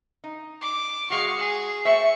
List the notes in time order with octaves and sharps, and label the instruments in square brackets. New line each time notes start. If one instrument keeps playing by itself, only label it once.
[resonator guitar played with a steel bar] D#4
[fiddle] D6
[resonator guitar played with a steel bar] G#3 F#4 [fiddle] F5 C#6
[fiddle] G#4
[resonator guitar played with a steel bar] A3 C5 E5 [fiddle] C#6